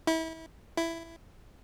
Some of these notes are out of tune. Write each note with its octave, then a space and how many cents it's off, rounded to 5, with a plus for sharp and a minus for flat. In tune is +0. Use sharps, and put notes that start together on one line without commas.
E4 -30
E4 +10